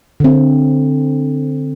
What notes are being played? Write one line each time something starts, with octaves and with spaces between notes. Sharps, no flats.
D3 C4